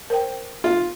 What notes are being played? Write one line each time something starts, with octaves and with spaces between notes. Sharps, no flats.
A#4 C5 G5
F4